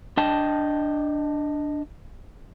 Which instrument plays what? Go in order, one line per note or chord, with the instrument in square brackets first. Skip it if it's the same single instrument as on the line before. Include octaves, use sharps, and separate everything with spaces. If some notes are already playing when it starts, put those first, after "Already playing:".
[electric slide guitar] D4 D#5 G5 A5